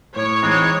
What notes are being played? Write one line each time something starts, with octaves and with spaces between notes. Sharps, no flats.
A2 C#5
E3 G#3 C4 D#4